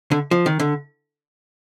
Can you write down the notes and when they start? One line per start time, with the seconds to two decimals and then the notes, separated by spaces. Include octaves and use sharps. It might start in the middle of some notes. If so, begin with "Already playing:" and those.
0.11 D3
0.31 F3
0.46 D#3
0.60 D3